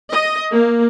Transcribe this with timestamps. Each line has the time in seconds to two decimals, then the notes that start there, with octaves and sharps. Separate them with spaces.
0.11 D#5
0.52 A#3